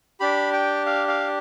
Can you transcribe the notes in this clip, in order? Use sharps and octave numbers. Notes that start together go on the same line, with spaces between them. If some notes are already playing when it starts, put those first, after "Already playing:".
D4 G4 B5
G5
F5
F5